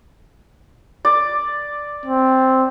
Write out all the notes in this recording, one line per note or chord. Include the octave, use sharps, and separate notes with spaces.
D5
C4